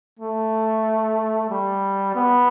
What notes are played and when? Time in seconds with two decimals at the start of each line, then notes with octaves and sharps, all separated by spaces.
0.19 A3
1.50 G3
2.15 B3